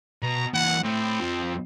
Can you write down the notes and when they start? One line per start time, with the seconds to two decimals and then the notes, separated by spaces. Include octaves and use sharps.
0.22 B2 A#5
0.54 E3 A#3 F#5
0.84 A2 C4
1.20 F2 F3